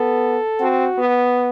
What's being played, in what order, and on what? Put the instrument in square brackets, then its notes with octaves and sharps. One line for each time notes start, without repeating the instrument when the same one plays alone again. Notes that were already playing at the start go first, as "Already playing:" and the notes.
Already playing: [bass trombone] B3 [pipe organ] A4
[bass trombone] C4 [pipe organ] F#4
[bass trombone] B3